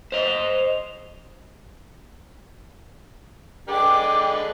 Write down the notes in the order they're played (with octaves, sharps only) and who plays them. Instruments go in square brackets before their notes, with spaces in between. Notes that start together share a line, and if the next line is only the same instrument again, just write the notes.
[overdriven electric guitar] C5 D#5 [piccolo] F7
[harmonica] D3 G#3 B4 [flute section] G5 D6